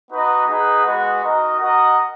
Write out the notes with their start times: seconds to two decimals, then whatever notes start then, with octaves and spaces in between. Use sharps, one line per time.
0.10 B3 D#4 F#4 B4 D#5
0.47 D#4 G#4 B4 D#5 F#5
0.85 G#3 B3 F#4 B4 D#5
1.23 D#4 F#4 A#4 D#5
1.60 F#4 A#4 D#5 F#5